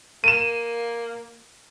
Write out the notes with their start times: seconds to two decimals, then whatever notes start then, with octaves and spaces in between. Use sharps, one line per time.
0.24 A#3 D#7 E7